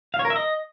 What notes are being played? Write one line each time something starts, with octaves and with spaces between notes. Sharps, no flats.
F5
C#5
A#4
E5
D#5